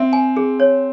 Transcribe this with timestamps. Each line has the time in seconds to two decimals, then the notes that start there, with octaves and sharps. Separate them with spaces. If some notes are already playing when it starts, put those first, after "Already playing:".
Already playing: C4 E5
0.13 G#5
0.37 G#4
0.60 C#5